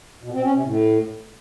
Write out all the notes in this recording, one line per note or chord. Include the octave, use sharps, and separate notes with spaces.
B2
C4
C#4
C3
A2